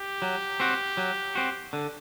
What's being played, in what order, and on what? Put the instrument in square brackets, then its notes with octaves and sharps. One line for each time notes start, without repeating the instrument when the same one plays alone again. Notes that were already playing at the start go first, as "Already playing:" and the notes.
Already playing: [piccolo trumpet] G4
[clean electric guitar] F#3
C4 F#4
F#3
C4 F#4
D3